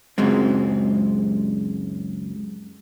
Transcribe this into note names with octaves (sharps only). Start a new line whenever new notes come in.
C#2 F#2 G#3 C4